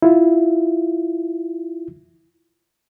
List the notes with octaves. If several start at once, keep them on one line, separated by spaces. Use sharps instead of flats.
E4 F4